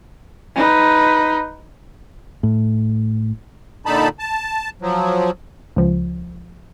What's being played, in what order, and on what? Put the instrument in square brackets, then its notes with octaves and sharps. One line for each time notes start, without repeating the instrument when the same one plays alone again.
[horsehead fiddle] D#4 B4
[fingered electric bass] A2
[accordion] A#2 D3 D#4 A5 B5
A5
F3 F#3
[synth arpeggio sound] C#2 F3